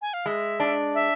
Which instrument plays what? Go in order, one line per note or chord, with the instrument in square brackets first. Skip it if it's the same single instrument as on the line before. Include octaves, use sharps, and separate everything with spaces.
[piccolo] G#5
F5
[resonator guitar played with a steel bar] G#3 [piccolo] E5
[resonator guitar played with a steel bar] D4
[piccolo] E5